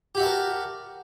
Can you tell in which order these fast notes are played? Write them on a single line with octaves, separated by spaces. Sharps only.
G4 F#4 E5 A5 A#4